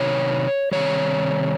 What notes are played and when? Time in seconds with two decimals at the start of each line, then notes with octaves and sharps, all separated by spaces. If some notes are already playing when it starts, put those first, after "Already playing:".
Already playing: C3 D#3 F#3 B3 C#5
0.72 C3 D#3 G3 C#5